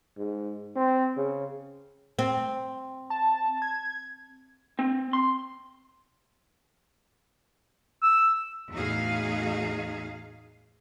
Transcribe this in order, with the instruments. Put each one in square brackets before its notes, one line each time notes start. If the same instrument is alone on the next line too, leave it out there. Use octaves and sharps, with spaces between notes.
[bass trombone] G#2
C4
C#3
[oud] C4
[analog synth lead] A5
G#6
[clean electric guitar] C4
C6
[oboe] E6
[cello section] E2 A2 D#4 F#4 G#4 F5